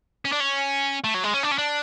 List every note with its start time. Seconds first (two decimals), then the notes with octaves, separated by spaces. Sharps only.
0.25 C#4
0.32 D4
0.40 C#4
1.04 A3
1.14 F#3
1.24 G#3
1.34 C#4
1.43 D4
1.52 C#4
1.58 D4